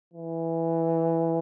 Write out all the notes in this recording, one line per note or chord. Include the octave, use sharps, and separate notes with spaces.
E3